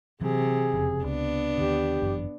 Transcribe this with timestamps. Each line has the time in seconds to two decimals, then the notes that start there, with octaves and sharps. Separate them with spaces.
0.21 C3 E3 F#3 G#4
0.74 E1 F2 C#3
1.04 C#2 B3 D4
1.58 D#2 D3 G4
2.02 G1 F#2 E3